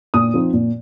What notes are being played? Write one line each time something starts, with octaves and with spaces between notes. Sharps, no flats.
A#2 D#6
F3 C4 D#4
A#2